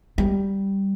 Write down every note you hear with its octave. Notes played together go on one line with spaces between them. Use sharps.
G3